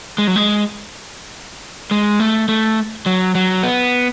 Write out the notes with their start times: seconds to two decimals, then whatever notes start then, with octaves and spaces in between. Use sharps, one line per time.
0.18 G#3
0.27 F#3
0.36 G#3
1.91 G#3
2.20 A3
2.48 A3
3.06 F#3
3.35 F#3
3.63 B3